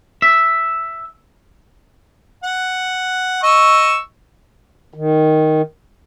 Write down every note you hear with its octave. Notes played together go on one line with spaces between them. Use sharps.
E5
F#5
D#5 C#6 E6
D#3